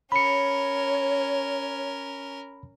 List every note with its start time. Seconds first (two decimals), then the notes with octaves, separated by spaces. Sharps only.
0.12 C#4 A#4 C#5 B5 C#7